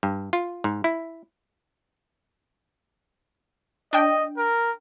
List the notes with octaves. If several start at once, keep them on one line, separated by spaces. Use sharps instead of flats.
G2
F4
G#2
E4
D4 D#5 G5
A#4